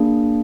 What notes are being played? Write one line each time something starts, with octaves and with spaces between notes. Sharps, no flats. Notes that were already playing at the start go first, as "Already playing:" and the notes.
Already playing: A#3 D4 G#4